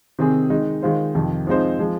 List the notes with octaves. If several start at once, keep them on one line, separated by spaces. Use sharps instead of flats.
C3 D#3 C4 G#4
D#3 G#3 D#4
D#3 G#3 F4 C5
F2 C3 D#3
F3 G#3 C4 D#4 C5
F3 G#3